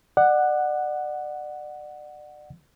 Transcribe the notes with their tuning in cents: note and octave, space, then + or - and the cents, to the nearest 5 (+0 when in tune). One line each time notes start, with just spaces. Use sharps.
D5 +30 F#5 +0